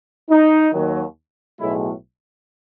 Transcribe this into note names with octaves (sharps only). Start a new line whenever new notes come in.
D#4
D#2 D#3 F#3
B1 A2 G#3 E4